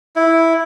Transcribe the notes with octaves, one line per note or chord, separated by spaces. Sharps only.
E4